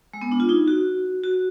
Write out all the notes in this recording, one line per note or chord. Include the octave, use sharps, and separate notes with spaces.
G#3
B3
D4
F4
D#4
F#4
F#4